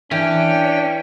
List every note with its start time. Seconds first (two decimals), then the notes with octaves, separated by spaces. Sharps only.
0.11 E3 C#4 D4 G5